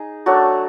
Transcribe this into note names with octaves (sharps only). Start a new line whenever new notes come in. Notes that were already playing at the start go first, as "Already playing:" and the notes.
Already playing: D#4 G#4
F#3 A3 D4 F#4